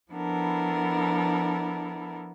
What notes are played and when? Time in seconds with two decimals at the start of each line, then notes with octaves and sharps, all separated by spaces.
0.12 F3 B3 D4 E4 A4 A#4